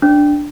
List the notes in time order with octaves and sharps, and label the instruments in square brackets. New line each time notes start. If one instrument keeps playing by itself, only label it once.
[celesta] D4